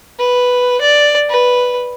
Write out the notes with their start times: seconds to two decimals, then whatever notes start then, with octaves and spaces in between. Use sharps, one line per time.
0.19 B4
0.81 D5
1.29 B4